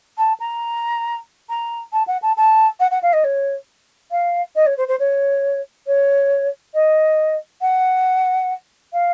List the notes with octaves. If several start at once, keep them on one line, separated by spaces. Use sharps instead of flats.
A5
A#5
A#5
A5
F#5
A5
A5
F#5
F#5
F5
D#5
C#5
F5
D#5
C#5
C5
C5
C#5
C#5
D#5
F#5
F5